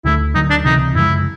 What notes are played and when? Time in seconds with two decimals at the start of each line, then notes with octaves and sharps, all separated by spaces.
0.05 D2 D3 F3 A3 E4
0.35 D2 D3 F#3 D#4
0.50 D4
0.65 C#2 C3 E3 D#4
0.95 F#2 C#3 F3 G#3 E4